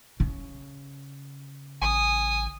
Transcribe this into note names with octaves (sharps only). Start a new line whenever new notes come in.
C#3
A1 G#5 D#6